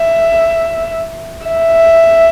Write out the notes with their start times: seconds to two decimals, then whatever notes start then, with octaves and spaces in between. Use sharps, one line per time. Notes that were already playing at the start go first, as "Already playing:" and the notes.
Already playing: E5
1.46 E5